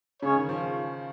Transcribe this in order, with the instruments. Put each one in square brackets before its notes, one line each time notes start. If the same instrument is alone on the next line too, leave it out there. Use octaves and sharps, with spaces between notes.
[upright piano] C#3 [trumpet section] G#3 C#4 G#4 C#5
[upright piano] D#3
F3